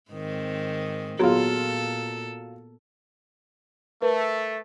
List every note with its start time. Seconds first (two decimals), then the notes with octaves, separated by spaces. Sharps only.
0.11 G#2 D#3 C4
1.19 A#2 F#3 B3 F4 G#4 A4 C6
4.02 A3 A#4 B4